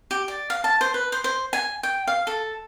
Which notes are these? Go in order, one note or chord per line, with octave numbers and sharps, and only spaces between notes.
G4
D5
F5
A5
C5
B4
C5
C5
G#5
G5
F5
A4